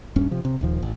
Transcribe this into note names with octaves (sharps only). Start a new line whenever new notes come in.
D#1 G2 C#4
C3 F3
C3
D#1 D#2 F3
A1